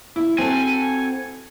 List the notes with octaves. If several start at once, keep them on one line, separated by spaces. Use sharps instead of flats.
E4
C4 F#4 A4 G#5